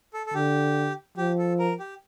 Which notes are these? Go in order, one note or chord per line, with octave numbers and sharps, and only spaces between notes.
A4
A4
D3 G4
F3 G4
A4
A#4
G4